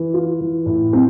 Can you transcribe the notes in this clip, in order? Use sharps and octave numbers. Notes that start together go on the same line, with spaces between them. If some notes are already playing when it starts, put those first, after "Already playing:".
Already playing: E3
F4
E3
A2
C4